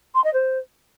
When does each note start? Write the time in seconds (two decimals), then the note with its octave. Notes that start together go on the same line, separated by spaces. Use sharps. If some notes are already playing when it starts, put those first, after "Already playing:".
0.14 C6
0.24 D#5
0.33 C5